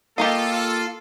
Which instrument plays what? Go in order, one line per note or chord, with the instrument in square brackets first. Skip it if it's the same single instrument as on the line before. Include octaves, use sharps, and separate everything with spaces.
[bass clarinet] A#3 [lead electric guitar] F4 F5 [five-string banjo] G4 A#4 D#5 [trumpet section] A4